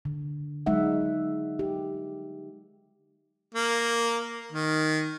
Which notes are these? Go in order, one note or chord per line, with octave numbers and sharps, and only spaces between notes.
D3
F#3 G#3 D#4 E5 F#5
G4
A#3
D#3